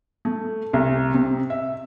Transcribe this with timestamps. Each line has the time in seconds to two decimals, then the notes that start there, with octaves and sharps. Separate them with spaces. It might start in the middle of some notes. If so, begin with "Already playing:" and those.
0.25 A3
0.73 C2
1.14 C3
1.50 E5